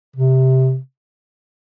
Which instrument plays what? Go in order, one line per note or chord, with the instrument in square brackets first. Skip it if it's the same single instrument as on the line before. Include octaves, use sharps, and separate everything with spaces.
[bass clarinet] C3